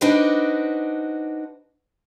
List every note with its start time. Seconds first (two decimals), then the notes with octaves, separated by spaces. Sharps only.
0.01 D4 D#4 F#4 B4 C5 D5